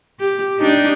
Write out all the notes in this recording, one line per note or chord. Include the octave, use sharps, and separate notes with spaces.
G4
D4 D#4 G4